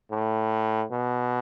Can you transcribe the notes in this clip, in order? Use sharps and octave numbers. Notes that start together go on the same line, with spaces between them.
A2
B2